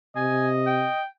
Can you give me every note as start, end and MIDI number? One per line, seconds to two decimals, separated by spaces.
0.16 0.86 48
0.16 1.02 75
0.16 0.48 80
0.67 1.06 79